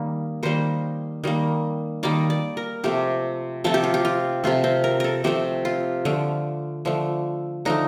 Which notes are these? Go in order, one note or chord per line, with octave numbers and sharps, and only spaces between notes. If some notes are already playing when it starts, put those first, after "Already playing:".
Already playing: D#3 G3 A#3
D#3 G3 A#3 C5
D#3 G3 A#3
D#3 G3 A#3 D5
D5
A#4
C3 F3 A3 G4
C3 F3 A3 A4
G4
F4
G4
F4
C3 F3 A3 F4
C4
A#4
A4 A#4
C3 F3 A3 G4
F4
D3 F3 A3
D3 F3 A3
D3 F3 A3 D#4